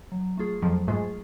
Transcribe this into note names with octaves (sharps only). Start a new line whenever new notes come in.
F#3
A3 F4 G#4
F2 F3 F#3
G#2 G#3 A3 F4 G#4